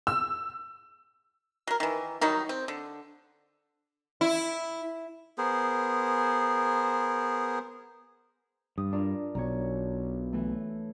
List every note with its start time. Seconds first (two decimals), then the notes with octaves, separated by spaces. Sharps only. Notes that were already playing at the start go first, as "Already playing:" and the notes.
0.07 E6
1.67 F#3 A#4
1.80 D#3 E3
2.21 D#3 F#3 G3 D#4
2.49 C4
2.68 D3
4.21 E4
5.38 B3 G#4 A#4 C5
8.78 G2 D#6
8.92 D4 F4 A#4
9.35 B1 B2 C#5 A#5
10.33 E3 A3